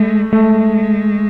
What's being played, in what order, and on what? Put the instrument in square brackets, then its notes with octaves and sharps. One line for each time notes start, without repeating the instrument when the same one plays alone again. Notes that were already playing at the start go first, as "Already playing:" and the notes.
Already playing: [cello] G#3 [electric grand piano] A3
[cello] G#3 [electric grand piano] A3